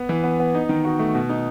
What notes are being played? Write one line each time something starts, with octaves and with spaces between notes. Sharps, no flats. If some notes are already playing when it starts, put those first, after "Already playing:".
Already playing: B3
E3
B3
B3
D#4
D#3
F#4
A3
B2
D#4